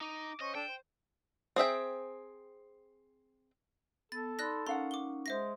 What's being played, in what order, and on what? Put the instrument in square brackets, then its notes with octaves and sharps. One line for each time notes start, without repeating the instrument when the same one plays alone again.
[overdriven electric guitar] D#4 [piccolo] D6
[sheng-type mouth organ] C#4 C5 [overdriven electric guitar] D#5 [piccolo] C#6
[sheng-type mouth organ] D4 A4 D5 [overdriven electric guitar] G5 [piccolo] E7
[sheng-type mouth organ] C5
[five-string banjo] C4 G#4 E5 G5
[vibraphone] B3 [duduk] A4 [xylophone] A6
[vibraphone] D#4 B5 C6 [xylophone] D5 F#6 A#6
[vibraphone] C#4 D#4 [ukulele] A#4 F5 F#5 [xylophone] C6
[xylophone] D6 G7
[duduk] G#3 [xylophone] C5 E5 A#6